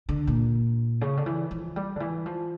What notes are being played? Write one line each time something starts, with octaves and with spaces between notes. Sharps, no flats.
D3
A#2
C#3
D3
E3
F3
G3
D3
E3
F3